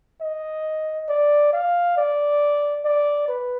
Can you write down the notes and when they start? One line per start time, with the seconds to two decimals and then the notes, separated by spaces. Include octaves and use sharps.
0.21 D#5
1.09 D5
1.53 F5
1.97 D5
2.85 D5
3.28 B4